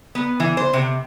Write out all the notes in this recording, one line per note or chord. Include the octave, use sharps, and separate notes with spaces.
B3
E3
C5
C3